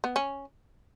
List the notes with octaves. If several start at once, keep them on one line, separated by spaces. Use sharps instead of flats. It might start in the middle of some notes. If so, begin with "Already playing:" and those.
B3
C#4